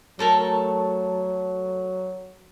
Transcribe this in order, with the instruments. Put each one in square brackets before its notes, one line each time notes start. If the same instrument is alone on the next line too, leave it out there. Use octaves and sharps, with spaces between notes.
[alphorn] F#3 [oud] A3 A4 A#4